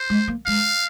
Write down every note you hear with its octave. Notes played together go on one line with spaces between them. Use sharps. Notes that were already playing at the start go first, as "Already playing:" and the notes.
Already playing: C5
G#3
A#3
G#3 F5